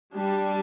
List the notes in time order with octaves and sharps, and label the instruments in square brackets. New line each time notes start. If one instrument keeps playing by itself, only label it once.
[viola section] G3 [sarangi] D4